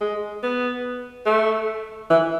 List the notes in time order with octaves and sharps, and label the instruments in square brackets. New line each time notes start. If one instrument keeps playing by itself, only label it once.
[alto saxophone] G#3
B3
A3
E3